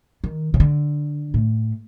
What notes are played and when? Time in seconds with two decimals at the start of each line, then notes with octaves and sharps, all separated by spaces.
0.24 D#3
0.54 C#3
0.60 D3
1.34 A2